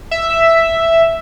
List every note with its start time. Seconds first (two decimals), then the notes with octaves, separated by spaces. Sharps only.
0.11 E5